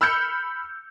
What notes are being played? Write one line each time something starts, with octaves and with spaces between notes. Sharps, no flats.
B5 E6 F6 G6 C#7